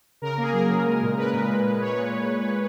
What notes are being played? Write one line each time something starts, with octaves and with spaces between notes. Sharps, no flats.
C#3 A#4
A#3 G#4
F#3 A#4
C#3
G#3
A#2
G#3 B4
A#2
G#3
A#2
G#3 C#5
A#2